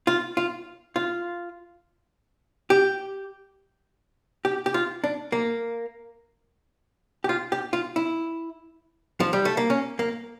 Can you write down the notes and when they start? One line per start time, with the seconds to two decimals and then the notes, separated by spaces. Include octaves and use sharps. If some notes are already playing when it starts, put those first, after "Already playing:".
0.07 F4
0.37 F4
0.96 F4
2.70 G4
4.45 G4
4.66 G4
4.74 F4
5.04 D4
5.32 A#3
7.24 G4
7.29 F4
7.52 G4
7.73 F4
7.96 E4
9.20 F3
9.33 G3
9.45 A3
9.57 A#3
9.70 C#4
9.99 A#3